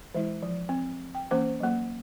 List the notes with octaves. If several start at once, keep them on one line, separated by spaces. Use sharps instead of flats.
E3 G#3 E4
F3
C4
G5
E3 A#3 C#4 C5 D6
F#3 A#3